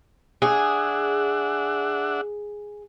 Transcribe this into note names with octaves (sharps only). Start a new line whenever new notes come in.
D4 G#4 E5 F#5